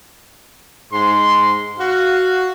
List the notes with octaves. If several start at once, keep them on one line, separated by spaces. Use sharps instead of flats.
G#2 C6
F#4 F5